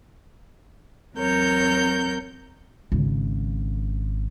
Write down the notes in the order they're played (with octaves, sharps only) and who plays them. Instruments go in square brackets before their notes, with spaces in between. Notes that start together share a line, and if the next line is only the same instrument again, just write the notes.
[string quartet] E2 F#3 C4 A#4 C#5 G6
[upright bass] G#1 C#3